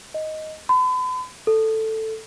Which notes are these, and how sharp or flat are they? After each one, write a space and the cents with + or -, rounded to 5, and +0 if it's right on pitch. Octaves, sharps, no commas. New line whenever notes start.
D#5 +5
B5 +40
A4 +5